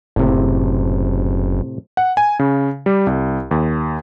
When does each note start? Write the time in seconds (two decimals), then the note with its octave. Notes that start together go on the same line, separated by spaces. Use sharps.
0.16 F#1 A2 C3
1.97 F#5
2.17 G#5
2.39 C#3
2.86 G3
3.07 C2
3.51 D#2